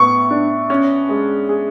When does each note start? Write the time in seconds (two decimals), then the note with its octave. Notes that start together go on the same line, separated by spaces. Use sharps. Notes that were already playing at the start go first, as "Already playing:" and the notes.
Already playing: A2 B3 C#6
0.31 D4
0.70 C#4
1.09 G#3
1.49 G#4